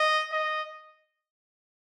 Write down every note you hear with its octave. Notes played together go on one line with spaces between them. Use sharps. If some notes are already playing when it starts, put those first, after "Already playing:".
Already playing: D#5
D#5